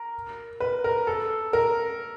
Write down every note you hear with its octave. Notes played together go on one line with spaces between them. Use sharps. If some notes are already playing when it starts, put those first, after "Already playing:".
Already playing: A#4
B4
A#4
A4
A#4